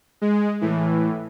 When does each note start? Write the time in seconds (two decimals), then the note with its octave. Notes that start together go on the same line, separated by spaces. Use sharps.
0.21 G#3
0.61 A2 E3